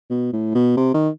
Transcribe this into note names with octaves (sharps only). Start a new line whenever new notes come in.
B2
A2
B2
C3
D#3